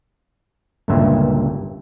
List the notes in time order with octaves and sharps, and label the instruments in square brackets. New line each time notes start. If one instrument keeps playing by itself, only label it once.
[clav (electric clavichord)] G1 C#2 G2 A#2 E5